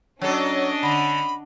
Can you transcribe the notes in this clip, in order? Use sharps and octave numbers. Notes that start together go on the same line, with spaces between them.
F#3 C#4 D4 A4 D#5
D3 B5